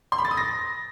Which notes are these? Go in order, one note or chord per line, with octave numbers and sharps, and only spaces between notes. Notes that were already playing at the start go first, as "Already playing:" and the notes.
C6
B5
A6
D#6
A#6